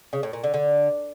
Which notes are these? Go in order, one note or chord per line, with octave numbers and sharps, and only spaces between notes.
C#3
A2
A#2
D3
D3